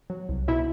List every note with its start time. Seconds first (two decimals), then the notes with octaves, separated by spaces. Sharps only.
0.10 F#3
0.29 C2
0.48 B2 E4 E5